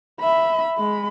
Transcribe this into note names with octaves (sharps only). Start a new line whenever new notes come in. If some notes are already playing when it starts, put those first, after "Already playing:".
E5 B5
G#3 B5